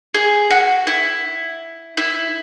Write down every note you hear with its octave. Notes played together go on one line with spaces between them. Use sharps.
G#4
F#4
E4
E4